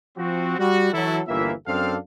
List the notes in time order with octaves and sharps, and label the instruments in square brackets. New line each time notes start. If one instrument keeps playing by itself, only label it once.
[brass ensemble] F3 C4 F#4
G3 F#4
E3 F#3 E4 A4
G1 D#2 E3 A#3 F4 E5
F#2 C4 D4 A4 F5